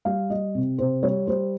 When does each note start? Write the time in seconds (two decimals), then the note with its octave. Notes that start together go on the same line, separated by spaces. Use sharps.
0.05 G3 F5
0.30 G3 D#5
0.55 C3
0.78 C3 C5
1.03 G3 C#5
1.27 G3 C5